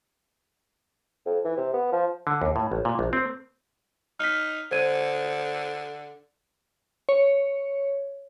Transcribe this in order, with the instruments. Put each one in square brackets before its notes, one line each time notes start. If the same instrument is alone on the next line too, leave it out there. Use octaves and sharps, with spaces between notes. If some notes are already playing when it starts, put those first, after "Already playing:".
[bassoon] F2
E3
C3
B3
F3
[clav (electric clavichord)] D3
D#2
A2
A1
A#2
A#1
C4
[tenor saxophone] D#4 [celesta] F6 B6
[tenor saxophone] D3 [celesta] C5 G#6 D#7
[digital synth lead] C#5